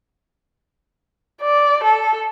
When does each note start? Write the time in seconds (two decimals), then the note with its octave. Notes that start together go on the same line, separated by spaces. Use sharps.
1.42 D5
1.84 A4